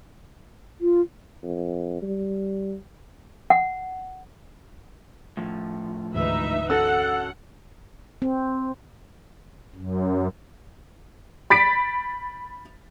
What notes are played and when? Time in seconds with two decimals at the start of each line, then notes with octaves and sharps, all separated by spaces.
0.81 F4
1.43 F2
2.02 G3
3.50 F#5
5.37 A2 F3
6.14 D2 G#2 E3 D#4 B4 E5
6.70 C#4 F#4 A4 F#5 E6
8.22 C4
9.75 F#2
11.50 B5 A6 B6 D7